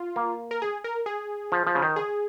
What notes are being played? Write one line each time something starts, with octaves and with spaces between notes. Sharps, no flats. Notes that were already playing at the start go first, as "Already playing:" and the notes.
Already playing: F4
A#3
A#4
G#4
A#4
G#4
F3
F3
C#3
D#3
G#4